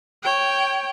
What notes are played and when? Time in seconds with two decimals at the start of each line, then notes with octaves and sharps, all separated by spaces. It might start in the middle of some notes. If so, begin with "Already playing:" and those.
0.23 C#5 G5